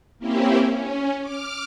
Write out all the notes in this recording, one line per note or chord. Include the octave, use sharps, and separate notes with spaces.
A#3 C4 C#4 E4 G4
C#4
D6 F6